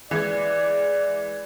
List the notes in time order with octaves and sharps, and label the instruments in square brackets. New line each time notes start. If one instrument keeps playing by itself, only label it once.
[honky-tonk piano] E3 G#3 G#6 [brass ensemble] D5